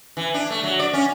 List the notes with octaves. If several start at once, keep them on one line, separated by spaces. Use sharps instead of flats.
E3
D4
A3
F#3
D5
C#4